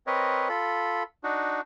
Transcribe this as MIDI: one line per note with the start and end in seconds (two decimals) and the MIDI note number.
0.07 0.48 60
0.07 0.48 70
0.07 0.48 71
0.07 0.48 73
0.07 0.48 75
0.49 1.03 65
0.49 1.03 69
0.49 1.03 83
1.24 1.61 62
1.24 1.61 63
1.24 1.61 66